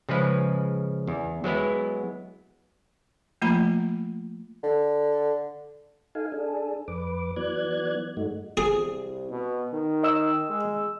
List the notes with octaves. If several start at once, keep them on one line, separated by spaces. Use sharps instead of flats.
C#3 F3 G#3 B4
E2
F#3 G#3 B3 E4
F3 A3 A#3 F4 A#5 B5
D3
D#4 A4 F5 G#5
D4 G#4 A4
F2 B4 D6
E3 F#3 B3 D5 F#6 G#6
G2 G#3 A3 D#4 F#4
C2 G#4
B2
D#3
D#5 E6
G#3